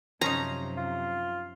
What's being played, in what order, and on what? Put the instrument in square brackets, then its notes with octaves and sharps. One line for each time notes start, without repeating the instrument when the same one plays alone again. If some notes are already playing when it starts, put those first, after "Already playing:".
[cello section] F#2 C3 [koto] F3 C#4 D#4 [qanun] A#5
[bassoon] F4